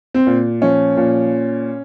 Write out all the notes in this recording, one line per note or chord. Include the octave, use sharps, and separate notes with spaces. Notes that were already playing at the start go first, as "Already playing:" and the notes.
C4
A#2
F3 C#4
A#2